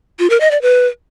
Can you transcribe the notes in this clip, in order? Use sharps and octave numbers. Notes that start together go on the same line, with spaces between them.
F4
A#4
D#5
D5
B4